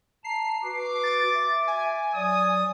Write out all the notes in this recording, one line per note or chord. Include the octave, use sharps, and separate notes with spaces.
A5 A#5 C7
F#4 B4 D6
A6
E5
G#5
F#3 D5 D#6